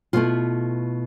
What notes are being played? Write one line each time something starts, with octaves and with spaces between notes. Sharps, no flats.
B2 A3 E4 F4